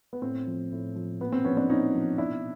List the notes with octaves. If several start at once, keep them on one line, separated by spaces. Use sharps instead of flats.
B3
A2 C4
F3
A2
F3
A#2 B3
C4
F3 B3 C#4
C4 D4
A#2 C#4 D#4
F3
B2 D4 E4